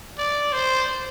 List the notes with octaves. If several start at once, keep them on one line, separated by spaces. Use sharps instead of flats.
D5
C5